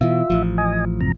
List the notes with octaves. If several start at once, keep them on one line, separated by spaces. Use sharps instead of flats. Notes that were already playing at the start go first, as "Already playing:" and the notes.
B2 E3 F4 E5
A1 F3
D#5 G#5
F#2 C3 A#5